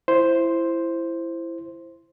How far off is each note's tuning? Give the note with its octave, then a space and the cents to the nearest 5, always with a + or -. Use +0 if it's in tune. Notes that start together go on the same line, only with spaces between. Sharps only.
E4 +20 C5 +0